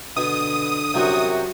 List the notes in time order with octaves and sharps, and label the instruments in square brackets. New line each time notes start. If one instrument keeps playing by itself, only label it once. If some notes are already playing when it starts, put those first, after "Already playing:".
[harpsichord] B2 [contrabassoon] D3 [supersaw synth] D#6
[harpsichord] C2 F#2 C3 [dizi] F#4